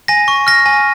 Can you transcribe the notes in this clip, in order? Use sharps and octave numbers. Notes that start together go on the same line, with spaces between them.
G#5 A#6
C#6
F6 A#6
G#5